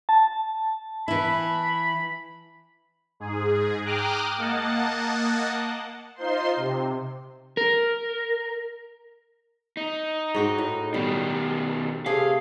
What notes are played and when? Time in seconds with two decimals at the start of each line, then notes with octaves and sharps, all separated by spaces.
0.09 A5
1.08 E3 E4 B5
3.20 G#2 G#4
3.86 G5 A#5 D6 D#6 F6 F#6
4.38 A#3 D#5 F#5 A5
6.15 D#4 F4 C5 C6
6.56 C3
7.57 A#4
9.77 D#4
10.35 G#2 F#4 G5
10.58 A2
10.94 B2 D#3 G3
12.06 C3 A3 G#4 F5